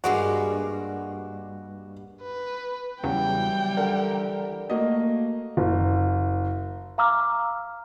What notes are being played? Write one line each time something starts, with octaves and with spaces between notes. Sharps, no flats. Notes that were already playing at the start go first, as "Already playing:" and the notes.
G2 G#3 A#3 F#4
B4
E2 C#3 E3 F#3 G3 G5
D3 A#4
A3 A#3 F#4 D#5
F#1
F5 A#5 D6 E6 F6